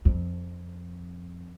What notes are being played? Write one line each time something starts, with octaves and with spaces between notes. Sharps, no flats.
F2